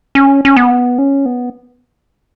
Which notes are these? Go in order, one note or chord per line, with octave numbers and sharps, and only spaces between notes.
C#4
C#4
B3
C#4
B3